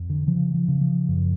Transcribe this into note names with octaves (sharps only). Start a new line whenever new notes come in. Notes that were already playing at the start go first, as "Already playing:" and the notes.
Already playing: F2
D3
C#3 F3
F3
C#3
F3
F#2